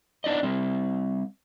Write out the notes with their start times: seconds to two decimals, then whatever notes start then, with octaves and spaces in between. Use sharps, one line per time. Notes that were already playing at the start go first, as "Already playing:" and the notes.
0.24 B3 D4 D#4 D5 D#5
0.43 G3 C4